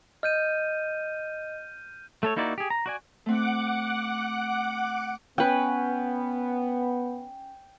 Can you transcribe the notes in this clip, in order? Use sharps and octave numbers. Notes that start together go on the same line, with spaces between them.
D#5 F6 G6 D#7
A3 A4 C#5
A#3 D#4 E4 F#4 D5
G4 G#4
A#5
F#4 D5 G#5
A3 C4 F#5 D6
B3 C#4 B4 G5